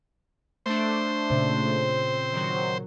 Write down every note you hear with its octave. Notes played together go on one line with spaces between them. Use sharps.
A3 D4 C5
A#2 C#3 C4
D#3 F#3